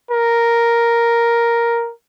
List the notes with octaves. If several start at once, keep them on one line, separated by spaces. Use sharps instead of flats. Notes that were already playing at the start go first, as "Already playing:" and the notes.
A#4